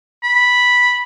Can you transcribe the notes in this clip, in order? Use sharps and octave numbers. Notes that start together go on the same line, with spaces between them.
B5